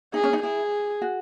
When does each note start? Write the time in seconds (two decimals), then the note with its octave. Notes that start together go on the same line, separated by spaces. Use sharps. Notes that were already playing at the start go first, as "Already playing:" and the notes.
0.14 D#4 G#4
0.24 C#4
0.33 D#4
0.42 E4 G#4
1.02 F#4